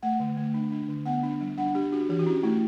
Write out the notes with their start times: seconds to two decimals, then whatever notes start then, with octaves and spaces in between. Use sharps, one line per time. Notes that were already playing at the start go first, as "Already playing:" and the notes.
0.03 A3 F#5
0.20 D3
0.37 A3
0.54 D4
0.72 D4
0.89 D3
1.05 B3 F#5
1.23 D4
1.41 G3
1.58 D4 F#5
1.74 D4 G4
1.92 D4 F#4
2.09 E3 G4
2.19 F#4
2.26 C#4 E4
2.43 A3 E4